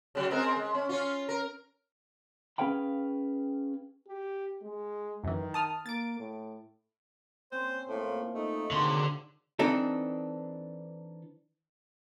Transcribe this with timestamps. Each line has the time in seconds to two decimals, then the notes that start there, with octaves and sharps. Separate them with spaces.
0.15 C#3 F#3
0.31 G#3 C4 A#4
0.56 G#3
0.74 C#4
0.89 C#4 F4
1.29 A#4
2.58 C#4 G#4 B4 F5 G5 B5
4.08 G4
4.62 G#3
5.24 F#2 D#3 E3
5.54 A5 D#6 F6
5.86 A#3 A6 D7
6.19 A2
7.52 C4 C#4 C5 C6
7.89 A2 F3 A#3
8.34 A3 D#4
8.71 G#2 D3 D#3 C4 F#4 C6
9.59 E3 C4 D4 D#4 A4